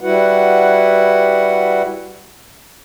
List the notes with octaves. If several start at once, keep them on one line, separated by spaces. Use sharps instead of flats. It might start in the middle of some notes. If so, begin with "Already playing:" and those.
G3 E4 F#4 B4 F#5